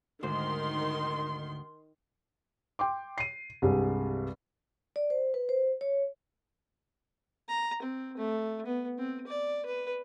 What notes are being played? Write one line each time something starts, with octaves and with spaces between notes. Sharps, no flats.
D2 G#2 D#3 C5 C6
G5 C6 D6
C7 D#7
C2 G2 G#3
D5
C5
B4
C5
C#5
A#5
C4
A3
B3
C4
D5
B4